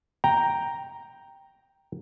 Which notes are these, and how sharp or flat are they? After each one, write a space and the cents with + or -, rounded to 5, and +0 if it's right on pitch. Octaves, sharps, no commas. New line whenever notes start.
G5 +0 A#5 +0